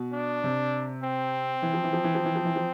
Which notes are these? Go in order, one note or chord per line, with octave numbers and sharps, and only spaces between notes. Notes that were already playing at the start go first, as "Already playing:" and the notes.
Already playing: B2
D4
C3
C4
E3
F3
E3
F3
E3
F3
E3
F3
E3
F3